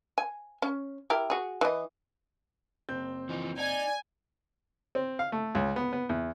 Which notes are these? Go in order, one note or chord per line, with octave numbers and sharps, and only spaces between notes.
G#5
C#4
E4 G4 A#4
F#4 G#4
E3 D#5
F#1 C4 G6
E3 F3 D#4
D#4 D5 G#5
C4
F5
A3
C#2
B3
B3
E2